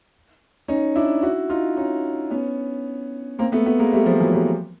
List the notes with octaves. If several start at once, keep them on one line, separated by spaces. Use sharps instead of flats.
C#4 D#4
D4 E4
E4 F#4
D#4 F4
C#4 D#4
B3 C#4
A#3 C4
A3 B3
A3 B3
G#3 A#3
G3 A3
F3 G3
E3 F#3
F3 G3